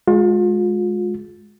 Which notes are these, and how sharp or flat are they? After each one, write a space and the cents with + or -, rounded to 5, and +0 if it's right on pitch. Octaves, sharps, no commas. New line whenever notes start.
G#3 +10 F4 +35